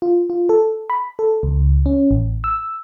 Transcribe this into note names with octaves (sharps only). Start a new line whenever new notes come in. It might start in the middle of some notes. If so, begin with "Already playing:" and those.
F4
F4
A4
B5
A4
C#2
C#4
A1
E6